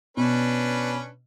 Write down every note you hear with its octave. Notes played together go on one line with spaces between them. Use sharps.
B2 C#4 D4 B4